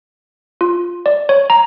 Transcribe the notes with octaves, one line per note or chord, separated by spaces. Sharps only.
F4
D5
C#5
A#5